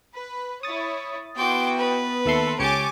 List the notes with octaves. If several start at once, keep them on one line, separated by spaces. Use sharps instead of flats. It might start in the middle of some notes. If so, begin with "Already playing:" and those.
B4
E4 C#5 D#6 A6
B3 E4 F#4 G5 C6 D6
B4
D#2 A4 E5 C6
C#2 G4 C#5 G#5 D6 A6 C#7